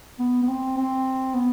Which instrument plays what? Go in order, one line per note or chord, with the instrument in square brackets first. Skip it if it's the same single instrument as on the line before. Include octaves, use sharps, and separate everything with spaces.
[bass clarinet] B3
B3
C4
C4
B3